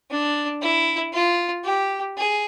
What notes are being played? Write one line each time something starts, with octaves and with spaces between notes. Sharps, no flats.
D4
E4
F4
G4
G#4